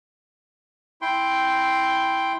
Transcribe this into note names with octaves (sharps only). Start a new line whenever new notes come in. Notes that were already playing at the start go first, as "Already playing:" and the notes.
E4 G5 C6